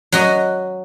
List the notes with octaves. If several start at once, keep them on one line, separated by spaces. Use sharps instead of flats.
F#3 F#4 D#5